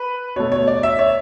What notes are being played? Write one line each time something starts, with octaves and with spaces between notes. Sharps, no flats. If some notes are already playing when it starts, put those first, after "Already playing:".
Already playing: B4
B2 A3 C#5
C#5
D5
E5
C#5